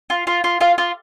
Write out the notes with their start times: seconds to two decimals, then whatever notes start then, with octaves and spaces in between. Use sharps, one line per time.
0.10 F4
0.27 F4
0.44 F4
0.61 F4 F5
0.78 F4